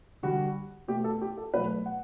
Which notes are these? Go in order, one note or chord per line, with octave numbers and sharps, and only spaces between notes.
D3 G3 F#4
B2 A3 G4
A4
G4
A4
B2 F#3 A3 B4
F#5